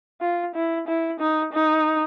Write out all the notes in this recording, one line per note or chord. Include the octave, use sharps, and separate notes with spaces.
F4
E4
E4
D#4
D#4